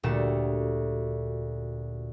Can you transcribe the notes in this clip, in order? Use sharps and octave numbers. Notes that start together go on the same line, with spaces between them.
D2 A#2 G3 F#4 A4 E7